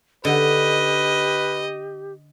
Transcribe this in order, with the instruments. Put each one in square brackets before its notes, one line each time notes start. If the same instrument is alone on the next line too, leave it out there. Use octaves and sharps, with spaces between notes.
[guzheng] D3 D#4 [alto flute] G4 [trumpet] B4 [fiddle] D#5